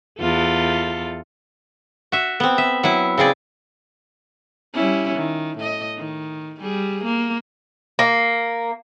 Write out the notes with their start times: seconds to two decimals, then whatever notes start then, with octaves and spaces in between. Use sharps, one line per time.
0.20 E2 F4 A4
2.12 F#4 E5
2.40 B3 C4
2.58 E5
2.83 F#3 E4
3.18 C#3 C4 G#4 D5
4.74 G3 C#4 E4
5.15 D#3
5.58 A2 D#5
5.97 D#3
6.60 G3 G#4
7.04 A#3
7.99 A#3